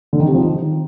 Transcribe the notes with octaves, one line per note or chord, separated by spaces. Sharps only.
D3
D#3
C3
F3
D#3